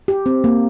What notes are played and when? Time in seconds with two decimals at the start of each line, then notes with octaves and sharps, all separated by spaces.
0.08 G4
0.26 C4
0.44 A#3